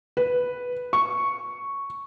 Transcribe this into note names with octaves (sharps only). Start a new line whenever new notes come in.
B4
C#6